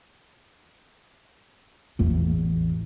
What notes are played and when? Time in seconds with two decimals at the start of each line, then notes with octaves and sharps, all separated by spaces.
1.99 A1 E2